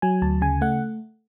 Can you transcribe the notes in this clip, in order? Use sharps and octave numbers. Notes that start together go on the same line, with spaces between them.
F#3 G#5
D2 A5
C#3 G#5
A3 F#5